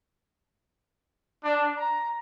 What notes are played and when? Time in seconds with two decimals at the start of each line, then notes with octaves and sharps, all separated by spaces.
1.45 D4
1.77 A#5